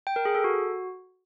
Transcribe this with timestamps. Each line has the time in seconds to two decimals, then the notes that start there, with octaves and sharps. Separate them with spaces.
0.07 G5
0.16 A#4
0.25 G#4
0.35 A4
0.44 F#4